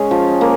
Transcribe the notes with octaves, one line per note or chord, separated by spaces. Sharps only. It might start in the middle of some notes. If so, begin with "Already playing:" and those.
Already playing: G#3 C#4 G#4 C#5
F3
A#3